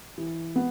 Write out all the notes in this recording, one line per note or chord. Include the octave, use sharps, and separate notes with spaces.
E3
B3